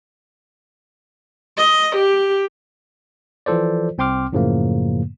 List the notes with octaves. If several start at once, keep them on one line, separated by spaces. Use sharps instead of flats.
D#5
G4
E3 F3 F4 A4 C5 D5
C2 C4 G5 C6 D6 F6
F#2 A2 C#3 F3 A3 A#3